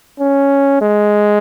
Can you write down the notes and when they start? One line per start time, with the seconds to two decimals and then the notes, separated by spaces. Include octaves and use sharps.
0.20 C#4
0.82 G#3